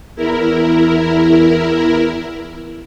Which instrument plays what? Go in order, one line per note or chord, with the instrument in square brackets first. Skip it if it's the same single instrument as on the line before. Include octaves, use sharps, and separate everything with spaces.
[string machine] E2 E4 A#4